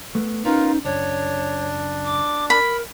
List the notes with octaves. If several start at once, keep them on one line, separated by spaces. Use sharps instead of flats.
A3 B3
B3 C#4 D#4 F4 A#4 B4
C#2 F#2 D4 C#5
D6
A#4 B5